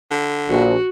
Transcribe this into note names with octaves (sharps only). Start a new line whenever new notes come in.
D3
A#1 F#4